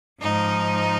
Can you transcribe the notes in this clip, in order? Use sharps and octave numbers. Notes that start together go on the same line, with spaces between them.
G#2 F3 D#4